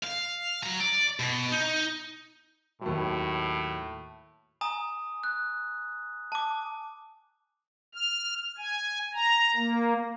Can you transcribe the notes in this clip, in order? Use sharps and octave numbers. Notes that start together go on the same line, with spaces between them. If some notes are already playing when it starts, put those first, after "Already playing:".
F5
F#3 A#5
D5
B2
D#4
D#2 A2 F#3
G#5 A#5 D#6
F#6
A5 D6
F6
G#5
A#5
A#3